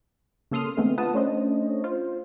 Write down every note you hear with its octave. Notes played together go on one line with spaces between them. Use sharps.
C#3 A#3 A4 C6 D#6 F6
D3 E3 G#3 A3 B3 C4
F4 B4 F#5 A5 D#6
A3 C#4 D4 C5 D#5
F4 C5